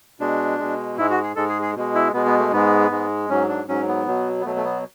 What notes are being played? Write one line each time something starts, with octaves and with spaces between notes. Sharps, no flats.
B2 G#3 D4
B2 G#3
G#2 G#3 E4
F#4
G#4
G#2 G#3 A4
G#4
G#4
B2 G#3
E4
B2 G#3 B3
B3
A3
G#2 G#3 B3
G#2 G#3
G#2 F#3 C#4
D4
G#2 F#3 C#4
B3
B2 F#3
B3
B2 F#3 A3
A3
B3